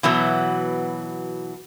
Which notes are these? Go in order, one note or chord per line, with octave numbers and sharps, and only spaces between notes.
B2 E3 F#3 B3